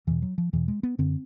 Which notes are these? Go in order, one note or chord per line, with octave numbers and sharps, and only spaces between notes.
E2 B2 E3
F#3
F3
E2 B2 E3
G#3
B3
F#2 D3 C4